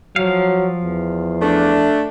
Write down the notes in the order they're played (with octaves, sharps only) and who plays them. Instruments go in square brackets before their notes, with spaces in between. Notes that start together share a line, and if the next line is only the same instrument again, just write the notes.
[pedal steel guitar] F3 F5 [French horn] F#3
[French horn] E2
[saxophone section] A3 D4